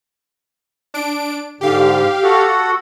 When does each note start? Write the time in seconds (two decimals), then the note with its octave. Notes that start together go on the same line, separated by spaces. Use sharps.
0.94 D4 D7
1.61 G#2 D3 G4 F5
2.23 F#4 A4 F#5